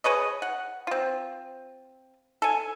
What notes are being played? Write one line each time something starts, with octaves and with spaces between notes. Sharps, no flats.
G#4 B4 C#5 D#5
F#5
C4 F4
A4 G#5